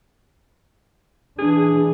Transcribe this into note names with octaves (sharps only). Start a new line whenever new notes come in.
E3 D4 G#4